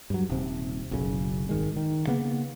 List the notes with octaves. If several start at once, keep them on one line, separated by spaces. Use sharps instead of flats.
G2 F#3
D#1 C3
F#1 B1 F#2 C#3
G#1 D#3 G#3
D#3
C#3 A#3 B3